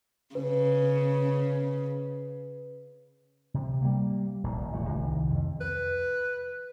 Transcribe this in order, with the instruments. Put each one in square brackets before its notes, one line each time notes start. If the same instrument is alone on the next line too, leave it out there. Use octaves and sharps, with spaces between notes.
[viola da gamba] C#3 [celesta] B4
[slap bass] C3
G3 A#3
D#1 A#1
D1 F2 A#2 A3
C2 D#3
F2
[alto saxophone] B4